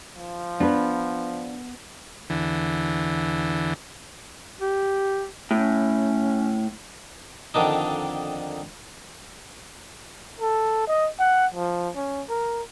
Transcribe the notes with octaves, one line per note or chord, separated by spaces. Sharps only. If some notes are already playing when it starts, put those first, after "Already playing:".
F3
B3 D4 B4
E2 D3 E3
G4
A2 C#4
F2 D3 D#3 D4 D#4
A4
D#5
F#5
F3
C#4
A#4